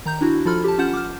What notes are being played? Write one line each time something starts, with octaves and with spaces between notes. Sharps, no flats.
D#3 A#5 G6
D4 E4 F#4
F3 F4 A4 B5 F6
G4 A5
C#4 F4 F#5 G6 E7
D6 F6